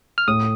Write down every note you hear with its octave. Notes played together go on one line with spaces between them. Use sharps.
F6
A2 D#6